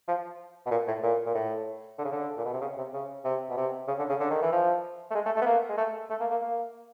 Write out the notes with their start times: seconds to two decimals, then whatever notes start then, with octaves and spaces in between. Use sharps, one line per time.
0.08 F3
0.66 B2
0.71 A#2
0.88 A2
1.03 A#2
1.26 A#2
1.35 A2
1.98 D3
2.05 C#3
2.12 D3
2.37 A#2
2.45 B2
2.54 C3
2.61 C#3
2.77 C3
2.93 C#3
3.25 C3
3.50 B2
3.57 C3
3.88 C#3
3.99 D3
4.09 C#3
4.20 D3
4.30 D#3
4.41 E3
4.52 F3
5.11 A3
5.15 G#3
5.26 A3
5.36 A3
5.42 B3
5.46 A#3
5.69 G#3
5.78 A3
6.10 A3
6.20 A#3
6.31 A#3
6.42 A#3